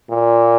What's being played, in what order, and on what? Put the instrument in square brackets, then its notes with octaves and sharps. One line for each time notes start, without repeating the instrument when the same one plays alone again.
[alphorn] A#2